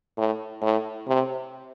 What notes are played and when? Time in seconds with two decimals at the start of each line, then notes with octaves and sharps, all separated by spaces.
0.17 A2
0.62 A2
1.07 C3